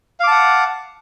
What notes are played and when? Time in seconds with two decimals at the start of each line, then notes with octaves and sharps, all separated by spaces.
0.20 F5
0.24 D6
0.27 A5
0.31 F#5